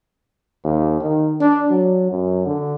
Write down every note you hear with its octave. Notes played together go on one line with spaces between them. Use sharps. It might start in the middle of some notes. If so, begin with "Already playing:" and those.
D#2
D#3
D4
F#3
F#2
D3